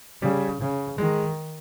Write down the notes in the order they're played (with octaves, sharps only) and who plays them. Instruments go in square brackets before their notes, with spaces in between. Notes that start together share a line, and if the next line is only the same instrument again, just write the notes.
[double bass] C#3 [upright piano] G3
[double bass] C#3
[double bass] D#3 [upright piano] G#3